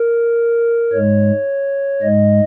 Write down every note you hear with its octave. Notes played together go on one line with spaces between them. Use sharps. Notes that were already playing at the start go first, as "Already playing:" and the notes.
Already playing: A#4
G#2 G#3 C#5
G#2 G#3 D#5